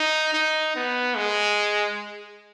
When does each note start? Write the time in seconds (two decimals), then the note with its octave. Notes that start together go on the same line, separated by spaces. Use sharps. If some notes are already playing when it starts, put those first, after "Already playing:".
Already playing: D#4
0.34 D#4
0.76 B3
1.16 G#3